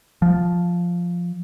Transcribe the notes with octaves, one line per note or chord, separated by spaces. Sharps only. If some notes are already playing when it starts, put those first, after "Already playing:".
F3